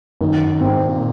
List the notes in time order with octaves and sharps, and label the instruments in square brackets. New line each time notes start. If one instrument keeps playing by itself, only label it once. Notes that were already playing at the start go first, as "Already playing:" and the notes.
[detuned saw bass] F#2 [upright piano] D#3
[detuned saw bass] F#2
[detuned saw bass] G#2 [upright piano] C4
[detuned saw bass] A#2